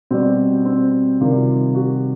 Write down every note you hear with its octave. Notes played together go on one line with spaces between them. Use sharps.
B2 G3 C4
C4
C3 D#3 G3 F4
F#4